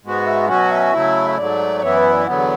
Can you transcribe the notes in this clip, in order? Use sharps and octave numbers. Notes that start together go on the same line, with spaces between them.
G#2 G#3 B3 F#4
E5
B2 F#3 C#4 F#4 F#5
E5
C#3 F#3 A3 E4
E5
G#2 F#3 A3 D5
D5
F#2 E3 B3 E4 C#5
B4
D5
E2 D3 F#3 B3 F#5